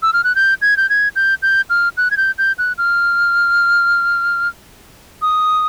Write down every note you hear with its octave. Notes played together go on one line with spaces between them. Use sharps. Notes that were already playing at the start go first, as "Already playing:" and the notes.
E6
F6
F#6
G6
G#6
G6
G#6
G6
G6
F6
F#6
G#6
G6
G6
F#6
F6
D#6